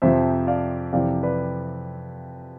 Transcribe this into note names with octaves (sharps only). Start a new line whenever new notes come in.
F2 C3 F3 C5 E5
D5 F5
F2 C3 E3 D5 F5
B4 D5